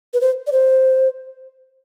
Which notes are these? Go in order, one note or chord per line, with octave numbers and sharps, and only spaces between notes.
B4
C5
D5
C5